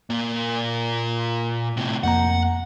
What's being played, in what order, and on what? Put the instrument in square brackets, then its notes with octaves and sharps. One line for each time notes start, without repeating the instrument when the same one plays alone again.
[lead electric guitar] A#2 A#3
A2 C3
[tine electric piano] F2 A#3 A#5 [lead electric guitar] F#5